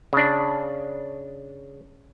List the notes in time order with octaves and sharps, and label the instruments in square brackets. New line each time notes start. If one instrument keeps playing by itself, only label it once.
[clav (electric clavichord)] C#3 D4